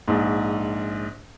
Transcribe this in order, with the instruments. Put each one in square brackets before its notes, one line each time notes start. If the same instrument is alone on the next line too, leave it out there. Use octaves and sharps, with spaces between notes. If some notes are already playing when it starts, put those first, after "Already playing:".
[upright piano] A#1 G#2